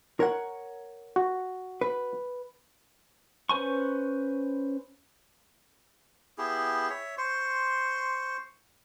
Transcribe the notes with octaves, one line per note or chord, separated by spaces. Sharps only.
A#4 C#5 F#5
F#4
B4
C#4 B4 C5 G#5 C#6
B3 E4 G4 G#4
C#5 E5
C5 C6 C#6